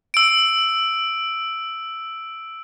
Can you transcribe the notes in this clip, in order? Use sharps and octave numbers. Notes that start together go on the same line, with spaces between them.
E6 D7